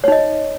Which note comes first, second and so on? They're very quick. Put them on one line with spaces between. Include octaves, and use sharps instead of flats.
C#5 D#4 D#5